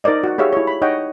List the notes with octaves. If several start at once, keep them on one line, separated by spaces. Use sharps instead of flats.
D#4 A#4 C5 D5 D#5
F#4 F#5
G4 G#4 C#5 E5 F5
E4 C#5
B5
D#4 C#5 D#5 F#5 G5